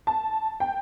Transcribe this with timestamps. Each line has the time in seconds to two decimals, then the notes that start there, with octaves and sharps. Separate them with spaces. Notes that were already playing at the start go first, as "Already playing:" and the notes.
0.07 A5
0.60 G5